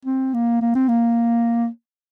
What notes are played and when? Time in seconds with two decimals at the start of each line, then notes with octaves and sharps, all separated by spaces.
0.05 C4
0.34 A#3
0.62 A#3
0.75 C4
0.88 A#3